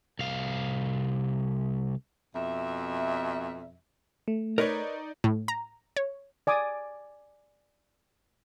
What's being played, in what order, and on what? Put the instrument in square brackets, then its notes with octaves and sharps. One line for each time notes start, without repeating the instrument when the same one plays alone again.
[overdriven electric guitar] C2 F5
[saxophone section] F2 B2 E5
[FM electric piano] A3
[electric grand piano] D#4 D5 [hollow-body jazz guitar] A#4 B4 C#5
[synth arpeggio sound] A2
A#5
C#5
[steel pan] D5 G#5 D6 D#6